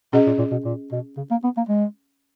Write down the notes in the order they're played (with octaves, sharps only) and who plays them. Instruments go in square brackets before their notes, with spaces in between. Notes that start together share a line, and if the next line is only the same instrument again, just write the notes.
[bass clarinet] B2 [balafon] C#4 G#4 D#5
[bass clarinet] A#2
A#2
B2
A#2
B2
C#3
A#3
B3
A#3
G#3